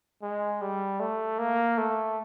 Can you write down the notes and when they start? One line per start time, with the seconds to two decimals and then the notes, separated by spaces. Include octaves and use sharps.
0.22 G#3
0.61 G3
1.00 A3
1.39 A#3
1.78 A3